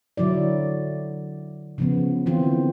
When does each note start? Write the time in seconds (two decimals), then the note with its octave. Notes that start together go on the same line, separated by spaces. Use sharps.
0.17 D3 F#3 E4 D5
1.78 C#3 F3 B3
2.26 D3 E3 C4 F4